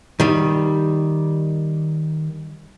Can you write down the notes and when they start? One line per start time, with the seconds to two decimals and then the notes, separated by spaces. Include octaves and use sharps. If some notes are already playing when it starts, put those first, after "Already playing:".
0.20 D#3 G3